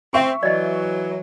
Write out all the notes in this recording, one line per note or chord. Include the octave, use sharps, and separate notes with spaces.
C4 E5 C#6
E3 F#3 D5 D#5